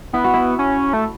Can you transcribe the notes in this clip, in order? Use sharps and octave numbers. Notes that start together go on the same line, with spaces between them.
B3 E4
F#4
E4
C#4
A3